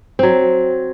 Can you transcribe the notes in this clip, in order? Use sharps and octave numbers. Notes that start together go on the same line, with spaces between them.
F#3 C4